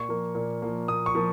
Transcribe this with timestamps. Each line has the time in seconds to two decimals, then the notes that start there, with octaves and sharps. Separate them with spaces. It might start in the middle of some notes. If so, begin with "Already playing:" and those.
Already playing: A#2 C#6
0.09 F3 A#3
0.35 A#2
0.62 F3 A#3
0.88 A#2 D#6
1.06 C#6
1.15 F3 A#3